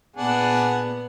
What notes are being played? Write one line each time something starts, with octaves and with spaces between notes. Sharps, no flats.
A#2 B3 D4 G#4 F#5